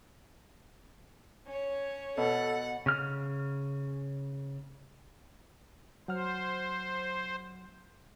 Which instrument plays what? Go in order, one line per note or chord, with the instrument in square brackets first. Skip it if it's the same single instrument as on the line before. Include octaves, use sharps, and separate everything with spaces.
[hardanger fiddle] C#4 C#5
[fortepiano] B2 [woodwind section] A4 [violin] F#5
[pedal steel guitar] C#3 F6
[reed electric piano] F#3 F#5 F6 [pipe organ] C5